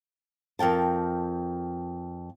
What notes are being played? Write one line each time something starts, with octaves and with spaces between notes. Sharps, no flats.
F2 A#4 G5 A5